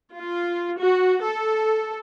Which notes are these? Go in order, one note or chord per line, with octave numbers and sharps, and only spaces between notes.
F4
F#4
A4